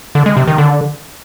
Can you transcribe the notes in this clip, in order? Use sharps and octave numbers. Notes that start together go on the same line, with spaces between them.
D3
G#3
C3
D#3
D3